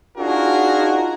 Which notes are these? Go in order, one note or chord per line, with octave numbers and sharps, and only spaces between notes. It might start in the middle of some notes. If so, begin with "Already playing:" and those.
D4 D#4 F4 F#4 G#4 A#4